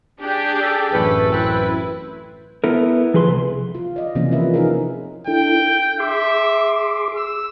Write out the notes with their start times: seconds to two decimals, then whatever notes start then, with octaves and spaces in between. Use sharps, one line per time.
0.20 D4 G4 G#4
0.61 A4
0.92 A1 F#2 E3 C#4 B4
1.32 C4 E4 B4
2.64 B3 E4 A4 A#4
3.14 F3 G#4 B4 C6
3.28 C2
3.75 F4
3.96 D5 D#5
4.15 C3 E3 F3 A#3 C#4
4.31 F3 C#4 F4 B4 E5
4.54 D#4 E4 G#4 A#4
5.27 D4 E4 A4 G5
5.67 G6
6.00 G#4 E5 C6 D6
7.16 E6